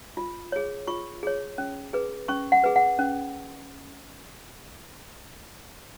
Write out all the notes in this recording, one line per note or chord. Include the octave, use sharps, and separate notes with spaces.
F4
G#4 C#5
F4 C#6
G#4 C#5
C#4
G#4 B4
C#4 C#6
F#5
G#4 B4
F#5
C#4